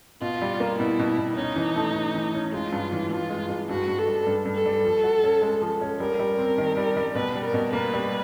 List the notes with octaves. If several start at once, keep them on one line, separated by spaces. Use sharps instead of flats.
B2 F4
G3
A#3
B2 E4
B2
B2
C#4 D#4
E3
A3
E3
E3
C#4
G#3 F4
G2
E3
G2 F4
G#3
G#3
G2 F#4
G2
A4
G3
G2
G2
A4
G3
F3
F#4
C#4
G#3
F3
C#4
G3 A#4
G3
C4
D#3
G3
G3
B2 B4
G3
A#4
B2
A#3 B4
G3